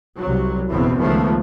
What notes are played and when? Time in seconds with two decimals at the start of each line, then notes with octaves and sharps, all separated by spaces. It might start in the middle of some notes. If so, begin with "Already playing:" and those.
0.20 C2 F#3
0.70 F#1 E2 B2 B3 C4
1.00 C#2 D#3 F3 A3 B3